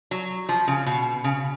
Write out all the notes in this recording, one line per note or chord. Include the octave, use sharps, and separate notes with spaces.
F#3
F3
C#3
B2
C#3